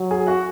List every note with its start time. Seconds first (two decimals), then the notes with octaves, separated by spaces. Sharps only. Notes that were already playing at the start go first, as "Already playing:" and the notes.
Already playing: F#3
0.11 G#4 G#5
0.27 F#4 F#5